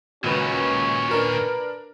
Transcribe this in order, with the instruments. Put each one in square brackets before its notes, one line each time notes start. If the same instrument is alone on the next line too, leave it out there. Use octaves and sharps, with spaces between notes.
[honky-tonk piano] C#2 B4 [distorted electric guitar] A#2 D#3 [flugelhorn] C#4 [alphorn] F#4
[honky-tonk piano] D4 A#4 [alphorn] B4